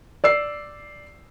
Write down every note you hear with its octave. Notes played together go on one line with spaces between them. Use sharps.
D5 E6 C7